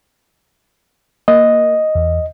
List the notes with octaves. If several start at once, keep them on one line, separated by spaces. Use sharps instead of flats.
A#3 D#5
E2